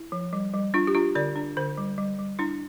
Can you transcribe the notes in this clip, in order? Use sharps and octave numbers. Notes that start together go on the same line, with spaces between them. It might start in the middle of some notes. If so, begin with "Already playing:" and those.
Already playing: E4
F3
G3
G3
D4 F4
G4
D4 F4
D3 D5
D4
D3 C5
G3
G3
G3
D4 E4